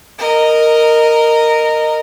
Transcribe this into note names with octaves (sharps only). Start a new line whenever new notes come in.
A#4 D#5